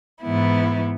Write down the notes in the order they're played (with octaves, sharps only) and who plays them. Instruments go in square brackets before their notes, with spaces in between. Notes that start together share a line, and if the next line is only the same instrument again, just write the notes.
[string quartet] G#2 E3 B3 E4